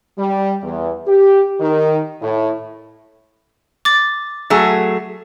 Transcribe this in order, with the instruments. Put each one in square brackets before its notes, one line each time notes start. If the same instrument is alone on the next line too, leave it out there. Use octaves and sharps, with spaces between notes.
[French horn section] G3
E2
G4
D#3
A2
[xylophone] D6 A6
[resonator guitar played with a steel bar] F#3 A3 G#4